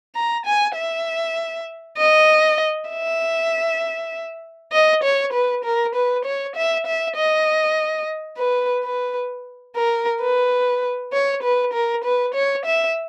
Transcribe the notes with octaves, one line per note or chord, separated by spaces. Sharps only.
A#5
G#5
E5
D#5
E5
D#5
C#5
B4
A#4
B4
C#5
E5
E5
D#5
B4
B4
A#4
B4
C#5
B4
A#4
B4
C#5
E5